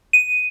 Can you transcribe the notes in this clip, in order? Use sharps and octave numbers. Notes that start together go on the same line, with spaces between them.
D#7